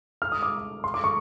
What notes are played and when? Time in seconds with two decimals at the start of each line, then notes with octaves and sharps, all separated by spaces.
0.22 F6
0.32 D#6
0.43 D6
0.84 C6
0.94 D6
1.04 C#6